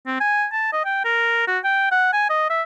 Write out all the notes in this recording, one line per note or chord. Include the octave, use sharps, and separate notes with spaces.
C4
G#5
A5
D#5
G5
A#4
F#4
G5
F#5
G#5
D#5
E5